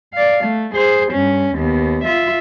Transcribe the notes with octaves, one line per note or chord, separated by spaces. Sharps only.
D5 F5
A3
G#4 C5
G2 C#4
D#2 B3
F4 E5